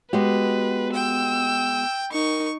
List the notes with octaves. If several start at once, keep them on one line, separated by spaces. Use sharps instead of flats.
G#3 B3 F#4 G4 B4
G5 E6
D#4 A#4 C#6